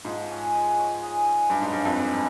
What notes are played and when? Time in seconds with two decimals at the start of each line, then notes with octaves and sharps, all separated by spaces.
0.05 G#2 F3
0.30 C#4
0.54 G#3
0.78 C#5
1.02 G#4
1.26 C#4
1.49 G2 F5
1.62 G#2
1.73 G2 C#5
1.85 F2
1.97 G#4